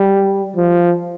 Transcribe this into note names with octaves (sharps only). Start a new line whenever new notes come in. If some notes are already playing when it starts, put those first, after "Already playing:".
Already playing: G3
F3